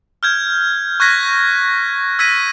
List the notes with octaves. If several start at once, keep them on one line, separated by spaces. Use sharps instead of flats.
F6 G6 G#6
C#6 F#6 G#6 A#6 B6
E6 G#6 A#6 B6 D#7